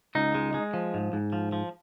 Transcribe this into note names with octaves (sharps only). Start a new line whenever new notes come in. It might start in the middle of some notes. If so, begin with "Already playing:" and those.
C#2 D#4
G#3
G#3
F3
G#2
G#2
F3
F3